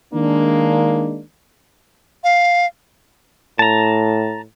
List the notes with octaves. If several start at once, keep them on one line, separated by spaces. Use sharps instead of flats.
D#3 G#3 A#3 D4
F5
A2 A5 A#5